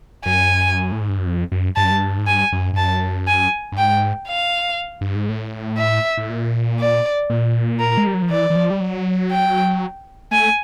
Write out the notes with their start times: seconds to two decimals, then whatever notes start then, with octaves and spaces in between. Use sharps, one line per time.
0.25 F#2 G#5
0.92 A2
1.01 G#2
1.09 G2
1.18 F#2
1.26 F2
1.52 F#2
1.76 G2 A5
1.84 F#2
1.91 G2
2.18 G#2
2.26 G2 G#5
2.52 F#2
2.73 G2
2.77 F#2 A5
3.28 G#5
3.72 G2
3.78 G#2 G5
4.28 F5
5.01 G2
5.15 G#2
5.29 A2
5.78 E5
6.18 A2
6.30 A#2
6.80 D5
7.30 A#2
7.80 A#4
7.97 G#3
8.07 G3
8.14 F#3
8.22 F3
8.30 E3 D5
8.50 E3
8.56 F3
8.70 G3
8.80 F#3
9.31 G5
10.31 A3 G#5